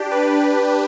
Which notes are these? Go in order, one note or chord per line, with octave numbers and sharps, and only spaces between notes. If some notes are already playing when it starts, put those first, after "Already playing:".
Already playing: D4 G4
G4 B4